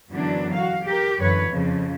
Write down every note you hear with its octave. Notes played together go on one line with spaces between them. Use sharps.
F#2 D3 E3 F#3 B3 D4
F#4 F5
G4 A#4
F#2 D3 E3 B4 C#5
F2 C#3 F3